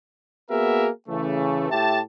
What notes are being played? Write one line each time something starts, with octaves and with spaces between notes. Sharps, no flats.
A#3 B3 F#4 G#4 A#4 E5
C#3 E3 A3
A2 G4 E5 G5 A5